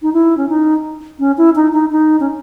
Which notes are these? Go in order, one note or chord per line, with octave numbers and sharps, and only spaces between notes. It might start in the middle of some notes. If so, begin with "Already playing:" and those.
D#4
E4
C#4
D#4
C#4
E4
D#4
D#4
D#4
C#4